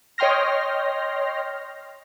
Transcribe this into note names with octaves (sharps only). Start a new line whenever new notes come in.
C#5 D#5 G5 C6 F6 A#6